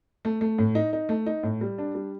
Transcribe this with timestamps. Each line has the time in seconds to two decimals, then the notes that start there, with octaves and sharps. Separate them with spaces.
0.25 A3
0.41 A3
0.58 A2
0.75 D#4
0.93 D#4
1.09 A3
1.26 D#4
1.43 A2
1.61 G3
1.78 D4
1.95 G3